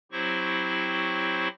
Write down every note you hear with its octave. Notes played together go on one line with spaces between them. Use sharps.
F#3 C4 E4 G4 C5 C#6